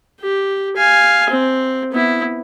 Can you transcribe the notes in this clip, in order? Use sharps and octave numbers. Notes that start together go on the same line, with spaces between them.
G4
F5 G#5
C4
B3 E4